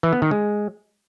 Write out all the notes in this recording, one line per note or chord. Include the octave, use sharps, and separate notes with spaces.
E3
B3
D#3
G#3